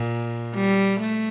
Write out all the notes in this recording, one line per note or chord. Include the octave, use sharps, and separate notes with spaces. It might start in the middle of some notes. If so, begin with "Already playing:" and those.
Already playing: A#2
G3
A3